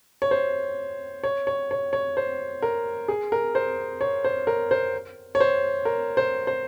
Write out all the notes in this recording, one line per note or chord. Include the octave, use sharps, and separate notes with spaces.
C#5
C5
C#5
C#5
C#5
C#5
C5
A#4
G#4
A#4
C5
C#5
C5
A#4
C5
C#5
C5
A#4
C5
C5